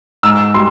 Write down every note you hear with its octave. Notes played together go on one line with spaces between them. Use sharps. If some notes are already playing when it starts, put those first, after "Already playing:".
G#2 E6
G3 C6